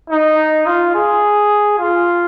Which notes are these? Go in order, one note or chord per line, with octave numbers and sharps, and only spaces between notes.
D#4
F4
G#4
F4